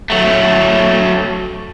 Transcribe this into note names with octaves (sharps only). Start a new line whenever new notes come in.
F#3 A3